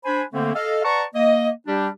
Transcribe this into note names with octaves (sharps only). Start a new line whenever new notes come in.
D4 C5 G#5 B5
D3 A3 A#3 C4
A4 D#5 F5
B4 D5 F#5 A5 A#5 C#6
A#3 D#5
G3 D4 G4